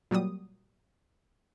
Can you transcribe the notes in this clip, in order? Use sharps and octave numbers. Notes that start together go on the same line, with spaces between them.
A#2 F#3 G3 D#6